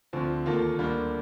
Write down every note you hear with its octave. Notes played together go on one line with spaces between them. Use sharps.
D2 D3 F3 C4
D#2 D#3 A#3 F4 A4
D2 D3 G3 A#3